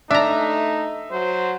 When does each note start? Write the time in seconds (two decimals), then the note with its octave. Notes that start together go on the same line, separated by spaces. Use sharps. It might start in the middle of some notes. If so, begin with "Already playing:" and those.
0.11 A3 D4 D#4 E5 A#5
1.11 F#3 C5